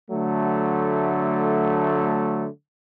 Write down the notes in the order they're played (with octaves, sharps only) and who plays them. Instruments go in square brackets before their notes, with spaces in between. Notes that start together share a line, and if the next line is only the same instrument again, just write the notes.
[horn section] D3 F#3 A3